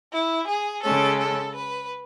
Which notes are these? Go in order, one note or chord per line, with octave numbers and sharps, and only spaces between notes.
E4
G#4
C#3 G#3 C#4 A4
A4
B4